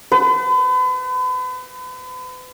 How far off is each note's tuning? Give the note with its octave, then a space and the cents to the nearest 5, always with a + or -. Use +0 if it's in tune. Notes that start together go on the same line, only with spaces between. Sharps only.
B4 +40